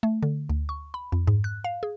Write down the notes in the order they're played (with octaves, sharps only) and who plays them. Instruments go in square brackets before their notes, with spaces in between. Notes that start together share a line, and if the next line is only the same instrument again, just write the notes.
[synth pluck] A3
D3
D2
C#6
B5
F2
G#2
F#6
F5
G#4